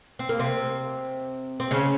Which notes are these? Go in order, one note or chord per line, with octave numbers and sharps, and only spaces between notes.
C4
A#3
C3 C4
C4
C#3 C#4